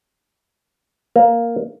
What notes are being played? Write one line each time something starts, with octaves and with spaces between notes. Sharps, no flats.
A#3